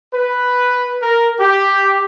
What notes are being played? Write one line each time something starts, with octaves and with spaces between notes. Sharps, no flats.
B4
A#4
G4